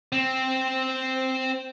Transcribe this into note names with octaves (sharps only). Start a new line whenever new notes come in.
C4